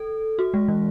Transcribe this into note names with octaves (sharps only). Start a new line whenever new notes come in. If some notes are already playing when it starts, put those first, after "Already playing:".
Already playing: A4
F#4
G#3
E3